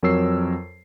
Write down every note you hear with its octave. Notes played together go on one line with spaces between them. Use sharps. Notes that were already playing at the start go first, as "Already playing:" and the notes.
F2 F#3 A#4 C#5 E6 C7